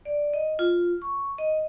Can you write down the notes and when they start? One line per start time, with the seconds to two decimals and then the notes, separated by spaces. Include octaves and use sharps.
0.05 D5
0.34 D#5
0.59 F4
1.02 C#6
1.38 D#5